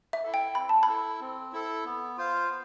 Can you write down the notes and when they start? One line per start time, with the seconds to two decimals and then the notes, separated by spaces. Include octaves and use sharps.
0.13 E5
0.24 E4 A4
0.34 G5
0.55 C4 B5
0.69 A5
0.83 B5
0.88 E4 A4
1.20 C4
1.53 E4 A4
1.85 B3
2.17 F4 C5 F5
2.49 B3